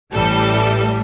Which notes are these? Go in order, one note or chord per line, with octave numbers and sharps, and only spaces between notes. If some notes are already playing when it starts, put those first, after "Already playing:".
A1 A2 E3 G3 A4